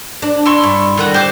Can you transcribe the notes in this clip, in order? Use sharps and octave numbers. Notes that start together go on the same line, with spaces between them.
D4
E4 C6 C#6
G2
D3 D#3 F4 F#4
G4 C5 D6